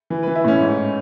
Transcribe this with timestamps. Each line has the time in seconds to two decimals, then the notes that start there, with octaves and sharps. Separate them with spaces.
0.10 E3
0.23 E3 B4
0.35 E4
0.44 A2 C#4
0.61 G#2